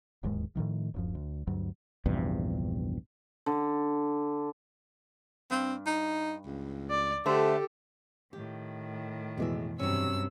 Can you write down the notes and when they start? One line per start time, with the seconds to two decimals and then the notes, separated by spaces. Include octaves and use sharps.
0.23 D1 D#2 G#2 G#3
0.55 A2 C3 D#3 F3
0.94 D1 F#2 F3
1.15 D2
1.47 D2 G2 F#3
2.05 A#1 E2 G2 C3
3.46 D3
5.51 G2 C4
5.86 D#4
6.46 C#2
6.90 D5
7.26 D3 A3 G4 A4 C5
8.33 A2 D#3 G4
9.37 F2 B2 E3 G#3 D5 E5
9.79 G2 C3 F#3 C#4 E6